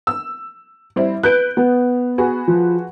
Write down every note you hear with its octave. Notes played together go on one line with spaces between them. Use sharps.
E6
G3 C4 E4
B4 F#6 G6 D7
B3
F#4 G#4 B4
F3